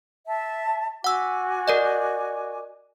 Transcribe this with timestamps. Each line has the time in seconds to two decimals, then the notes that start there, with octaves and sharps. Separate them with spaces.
0.27 E5 A5
1.04 F#4 F#5 G#5 D6 E6
1.68 A#4 D5 D#5